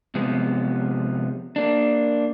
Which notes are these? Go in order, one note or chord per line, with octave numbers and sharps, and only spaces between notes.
C3 F3 G#3 B3
A#3 D4